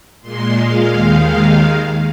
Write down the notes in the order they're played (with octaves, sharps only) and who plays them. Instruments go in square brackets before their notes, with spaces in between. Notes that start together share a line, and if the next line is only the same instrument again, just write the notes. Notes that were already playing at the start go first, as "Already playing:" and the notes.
[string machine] A#2 G#3 C6
F5
D#2 D#3 G#3 F5
F5